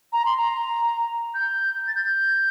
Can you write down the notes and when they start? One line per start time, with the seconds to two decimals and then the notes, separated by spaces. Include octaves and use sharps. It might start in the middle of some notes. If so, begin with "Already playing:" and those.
0.13 A#5
0.26 C6
0.37 A#5
1.35 G6
1.88 A6
1.95 G6